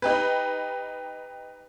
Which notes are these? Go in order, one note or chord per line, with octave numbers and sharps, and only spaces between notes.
D#4 G4 B4